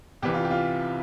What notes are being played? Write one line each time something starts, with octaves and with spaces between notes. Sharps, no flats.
C2 C3 E3 G4
F4
G4
F4